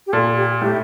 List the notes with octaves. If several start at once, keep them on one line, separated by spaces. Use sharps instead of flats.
G4
A#2 A4
G4
A2 G4